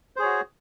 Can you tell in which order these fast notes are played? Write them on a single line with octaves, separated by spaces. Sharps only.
C5 G#4 C#5 F#4